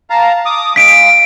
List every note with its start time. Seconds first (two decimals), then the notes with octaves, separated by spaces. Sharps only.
0.10 F5 A5 A#5
0.45 D6 D#6
0.76 G#3 F5 B6 D7